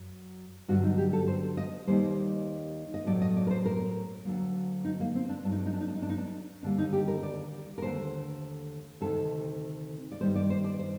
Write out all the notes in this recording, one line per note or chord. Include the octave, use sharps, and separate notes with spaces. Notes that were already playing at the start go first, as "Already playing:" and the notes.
Already playing: F#2 F#3
G2 D3 F#3 F#4
D#4
G4
A4
C5
D#5
D#2 D#3 G3 A#3 C5
D#5
A2 F#3 A3 D5
D#5
D5
A#4
C5
A#4
D2 D3 F#3 A#3
D#4
A#3
C4
D4
G2 F#3 A3 D4
D#4
D4
D#4
D4
D#4
D4
D#4
D4
D#4
D4
D#2 D3 G3 A#3 D4
D#4
G4
A#4
D5
A#4
D#2 D3 A3 C5
D2 C3 D#3 A4
D5
G2 D#3 G3 C5
D5
C5
D5
C5